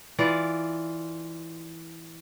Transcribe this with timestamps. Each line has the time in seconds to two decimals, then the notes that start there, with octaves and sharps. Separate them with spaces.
0.19 E3 F4 D5